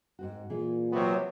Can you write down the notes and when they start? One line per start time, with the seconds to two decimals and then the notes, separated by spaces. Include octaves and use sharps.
0.19 G#2 C4 F#4
0.50 A#2 E3 G#4 D5
0.93 C3 F#3 B3 F#4